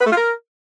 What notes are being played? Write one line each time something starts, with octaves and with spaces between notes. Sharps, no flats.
B4
A3
F4
A#4